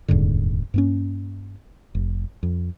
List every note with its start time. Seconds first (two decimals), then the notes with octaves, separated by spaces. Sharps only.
0.08 D#1 F2 G#2 D3
0.74 G2 A#3 C#4
1.95 F1
2.43 F2